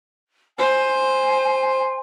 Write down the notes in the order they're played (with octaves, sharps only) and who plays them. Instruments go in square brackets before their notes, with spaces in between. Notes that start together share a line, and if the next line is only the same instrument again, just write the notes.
[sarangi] C5 [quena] G#5